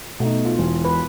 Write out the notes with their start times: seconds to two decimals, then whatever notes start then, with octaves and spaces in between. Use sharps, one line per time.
0.20 B2 A3 D#4
0.45 F4
0.58 E1
0.85 B4